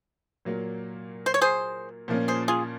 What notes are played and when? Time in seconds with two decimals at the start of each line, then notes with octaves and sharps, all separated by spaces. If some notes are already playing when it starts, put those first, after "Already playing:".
0.45 A#2 F#3 A#3
1.26 C5
1.34 C#5
1.41 G#4 C5
2.08 A#2 F3 A#3 C#4
2.28 G#4 C5
2.48 F4 G#4